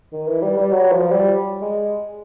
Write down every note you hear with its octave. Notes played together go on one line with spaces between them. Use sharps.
D#3
E3
G3
G3
F#3
F3
G3
G#3